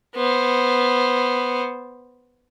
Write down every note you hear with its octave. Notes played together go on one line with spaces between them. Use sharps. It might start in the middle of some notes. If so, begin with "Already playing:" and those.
B3 C5